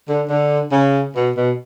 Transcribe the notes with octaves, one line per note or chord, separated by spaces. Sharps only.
D3
D3
C#3
B2
B2